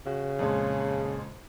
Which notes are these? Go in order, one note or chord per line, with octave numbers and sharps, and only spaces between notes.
C#3 F#4
F2 A#2 G#3